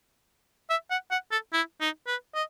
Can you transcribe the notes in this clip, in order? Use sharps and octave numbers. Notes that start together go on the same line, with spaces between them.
E5
F#5
F#5
A4
E4
D#4
B4
D#5